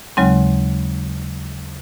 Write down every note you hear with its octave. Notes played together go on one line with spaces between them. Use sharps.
D#2 C#3 F#3 G#3 C4